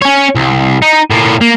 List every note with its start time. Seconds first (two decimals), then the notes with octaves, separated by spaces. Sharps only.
0.02 C#4 C#5
0.35 C2
0.82 D#4
1.11 A2 A#3
1.41 A#3